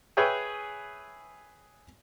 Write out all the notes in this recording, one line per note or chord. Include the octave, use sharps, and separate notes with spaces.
G#4 B4 C#5 E5 G5